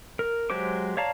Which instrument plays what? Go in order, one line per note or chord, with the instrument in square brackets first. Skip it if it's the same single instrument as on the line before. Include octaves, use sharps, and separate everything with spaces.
[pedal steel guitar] A#4
F#3 G#3 G4 C5 D6
C#5 D5 F5 A5 A#5